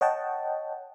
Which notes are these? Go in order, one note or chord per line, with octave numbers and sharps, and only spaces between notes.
C#5 D#5 F#5 G5 A5